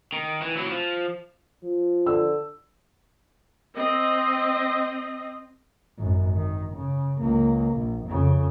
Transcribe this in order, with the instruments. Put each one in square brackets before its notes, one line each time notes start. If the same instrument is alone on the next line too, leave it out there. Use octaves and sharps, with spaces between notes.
[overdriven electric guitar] D#3
E3
F#3 E4
F3
[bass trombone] F3
[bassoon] D3 [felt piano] E6
[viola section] C4 D#5
[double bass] G#1 F#2
D#3
C#3
C#2 A#3
A#1
F2 C#3